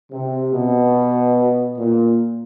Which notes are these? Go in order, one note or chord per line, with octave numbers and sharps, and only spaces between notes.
C3
B2
A#2